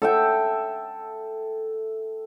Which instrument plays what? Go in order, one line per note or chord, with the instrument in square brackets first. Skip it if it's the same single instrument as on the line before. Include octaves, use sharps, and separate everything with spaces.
[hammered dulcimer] A4 E5 G5